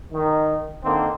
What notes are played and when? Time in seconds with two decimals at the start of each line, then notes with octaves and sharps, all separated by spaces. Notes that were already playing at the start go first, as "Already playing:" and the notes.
0.13 D#3
0.84 D3 D#3 A#3 C4